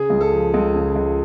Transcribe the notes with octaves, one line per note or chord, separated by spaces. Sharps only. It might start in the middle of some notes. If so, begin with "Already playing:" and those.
Already playing: C#3 G#4
C#2
A4
F3
C#2
C#3
C#2